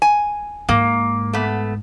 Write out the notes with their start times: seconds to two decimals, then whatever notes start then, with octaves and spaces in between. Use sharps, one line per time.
0.02 G#5
0.69 G#2 A#3
1.33 A3 B3